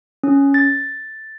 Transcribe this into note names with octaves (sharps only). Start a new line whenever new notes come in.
C#4
A6